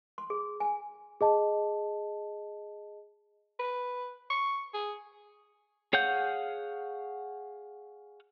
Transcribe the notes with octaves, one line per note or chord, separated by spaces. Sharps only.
C6
G#4
G#5
G#4 D#5 A5
B4
C#6
G#4
G#4 C#5 F5 F#5 G6